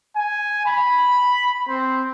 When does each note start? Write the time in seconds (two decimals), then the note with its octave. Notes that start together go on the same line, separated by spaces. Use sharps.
0.16 G#5
0.66 B5
1.68 C4